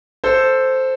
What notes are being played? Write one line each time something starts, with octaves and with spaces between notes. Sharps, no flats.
A4 C5